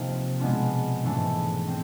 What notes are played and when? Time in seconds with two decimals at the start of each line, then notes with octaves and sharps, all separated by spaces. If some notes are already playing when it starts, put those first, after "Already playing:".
Already playing: C3 F3 A#3 D#4
0.40 B2 G#3 B3 D4 F4
1.04 G#2 E3 A3 D4
1.68 C4